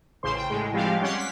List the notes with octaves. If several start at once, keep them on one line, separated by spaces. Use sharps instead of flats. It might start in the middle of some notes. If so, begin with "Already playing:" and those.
A1 C#3 C5 C6
G5
A2 G#3
F3 G3 G#3 C4 G4 F5
C#4 C#5 F#5 C6 D6
B6